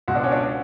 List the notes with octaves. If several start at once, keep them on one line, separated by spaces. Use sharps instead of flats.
C#2 B2 F#4
D4
C#4
D4
F#4